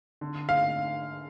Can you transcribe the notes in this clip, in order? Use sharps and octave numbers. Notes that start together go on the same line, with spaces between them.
D3
F5